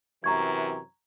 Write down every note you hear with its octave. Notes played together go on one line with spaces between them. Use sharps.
F#2 C3 E3 A#5 C#6 G#6